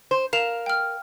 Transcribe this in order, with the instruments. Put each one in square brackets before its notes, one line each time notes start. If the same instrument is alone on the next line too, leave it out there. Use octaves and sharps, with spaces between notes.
[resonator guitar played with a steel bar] C5
[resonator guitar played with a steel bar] A#4 [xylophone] F5 E7 F7
[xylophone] G5 F6